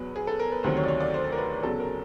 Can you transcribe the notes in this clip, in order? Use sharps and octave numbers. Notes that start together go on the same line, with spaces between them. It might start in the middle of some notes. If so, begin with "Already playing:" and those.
Already playing: E2 B2 F#3 B4
G#4
A4
A#4
B4
D2 C3 D#3 F#3 C5
C#5
D5
C#5
D5
C5
A#4
B4
E2 C#3 F#3 A4
A#4